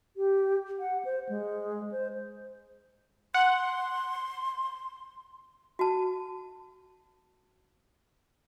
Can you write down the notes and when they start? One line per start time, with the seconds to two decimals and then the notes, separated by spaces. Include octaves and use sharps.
0.17 G4
0.79 F#5
1.05 C5
1.29 G#3
1.92 C5
3.34 F#5 C6
5.79 F#4 A5